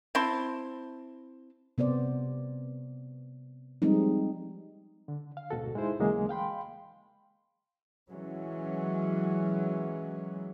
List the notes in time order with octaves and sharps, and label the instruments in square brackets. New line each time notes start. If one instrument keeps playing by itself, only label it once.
[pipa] C4 E4 A5 C6
[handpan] C3 B3 C5 D5
F3 G3 G#3 C4 D#4
[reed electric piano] D3
F5
D2 G#2 B2 F#4 A4
G#3 D#4 E4 C5
D#2 C#3 E3 F#3 G#3 A#3
F5 G5 B5 C6
[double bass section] E3 F#3 G#3 C#4